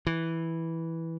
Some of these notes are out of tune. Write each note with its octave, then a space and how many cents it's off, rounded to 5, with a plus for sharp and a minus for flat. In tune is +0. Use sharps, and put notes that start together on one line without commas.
E3 -5